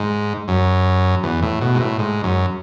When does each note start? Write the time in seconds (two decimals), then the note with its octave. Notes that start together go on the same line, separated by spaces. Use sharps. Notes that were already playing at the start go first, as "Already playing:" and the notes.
Already playing: G#2
0.48 F#2
1.23 E2
1.42 A2
1.61 B2
1.75 G#2
1.80 A2
1.99 G#2
2.24 F#2